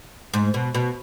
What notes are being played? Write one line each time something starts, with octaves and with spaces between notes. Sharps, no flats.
G#2
B2
B2